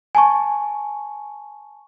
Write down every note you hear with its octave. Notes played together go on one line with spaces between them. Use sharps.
G#5 A5 C#6